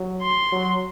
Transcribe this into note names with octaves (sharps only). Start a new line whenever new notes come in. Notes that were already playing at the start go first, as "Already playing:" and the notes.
Already playing: F#3
C6
F#3